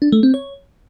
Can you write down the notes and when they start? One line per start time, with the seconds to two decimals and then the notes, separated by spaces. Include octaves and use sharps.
0.02 D4
0.12 A3
0.23 C4
0.34 C#5